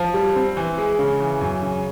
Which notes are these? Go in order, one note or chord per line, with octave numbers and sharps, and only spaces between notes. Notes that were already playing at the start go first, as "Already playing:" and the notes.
Already playing: F3
G3
C4
E3
G#3
C#3
E3
F#2
C#3